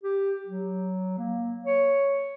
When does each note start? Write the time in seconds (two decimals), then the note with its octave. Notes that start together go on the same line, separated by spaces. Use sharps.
0.03 G4
0.46 F#3
1.18 A#3
1.65 C#5